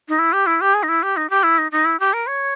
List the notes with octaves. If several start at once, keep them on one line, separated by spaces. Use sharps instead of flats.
D#4
E4
G4
E4
G4
G#4
D#4
E4
G4
D#4
G4
E4
D#4
D#4
E4
G4
A#4
C#5